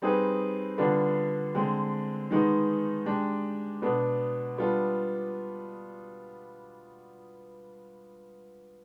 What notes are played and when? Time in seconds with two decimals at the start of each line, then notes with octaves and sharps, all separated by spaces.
0.02 G3 C4 D#4 G#4 B4
0.78 D3 G3 B3 D4 F4
1.54 D3 G#3 C4
2.30 D#3 G#3 B3 D#4
3.06 G#3 D4 G4
3.82 B2 B3 D4
4.58 G3 B3 D4 F4